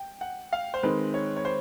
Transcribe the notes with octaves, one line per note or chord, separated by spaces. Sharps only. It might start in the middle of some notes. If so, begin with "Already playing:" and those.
Already playing: G5
F#5
F5
C5
D#3 G#3 C4 B4
C#5
C#5
C5